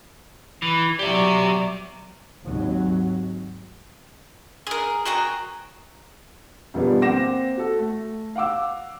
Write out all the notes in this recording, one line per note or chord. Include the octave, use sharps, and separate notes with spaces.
E3
F#3 G4 D5 E5
G#1 D#2 G#2 F#3
G#4 A#4
F#4 G#4 G5 A#5
E1 F3 G3 B3 D4
A#3 C4 F#5 D6 A#6 E7
F#4 A4
A3
F5 F#5 D6 E6